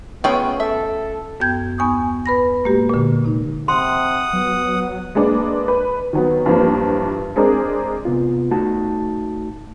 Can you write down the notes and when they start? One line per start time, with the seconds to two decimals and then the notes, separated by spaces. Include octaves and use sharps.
0.24 A3 B3 C#4 F4 G#4 G5
0.60 A4 E5
1.40 F#2 B3 G5 G6 G#6
1.78 D#2 B3 G#5 C#6 D#6
2.26 B4 B5 A#6
2.64 A2 G#3 A#3 F#4 G4
2.89 A#2 D3
3.24 C3 D#4
3.68 C3 F#5 C6 D#6
4.33 F#3 B3
5.15 G#3 A#3 D4 B4
5.68 B4
6.13 D#3 F#3 B3
6.46 G2 E3 F3 A#3
7.36 G#3 C4 D4 G#4 A#4
8.05 C3 B3 F4
8.51 A3 D#4 F#4 A5